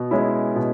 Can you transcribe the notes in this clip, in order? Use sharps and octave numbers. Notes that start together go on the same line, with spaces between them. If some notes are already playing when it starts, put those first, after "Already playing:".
Already playing: B2
G#3 C#4 E4
B2